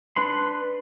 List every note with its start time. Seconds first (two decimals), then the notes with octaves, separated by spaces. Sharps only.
0.16 D4 B4 B5 C6